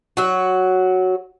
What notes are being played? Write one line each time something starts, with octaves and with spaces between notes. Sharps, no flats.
F#3 F#4